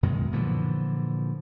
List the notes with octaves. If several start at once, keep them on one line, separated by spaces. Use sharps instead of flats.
F#2 B2 D#3 G#3
A#2 D3 E3 F3